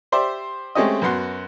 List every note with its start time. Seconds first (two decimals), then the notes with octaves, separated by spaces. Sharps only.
0.12 G4 C5 D5 E5
0.75 G#3 A3 C4 C#4 G4 D#5
1.02 F#2 B3 F#4 C6